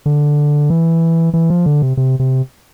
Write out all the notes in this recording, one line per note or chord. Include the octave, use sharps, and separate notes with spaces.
D3
E3
E3
F3
D3
C3
C3
C3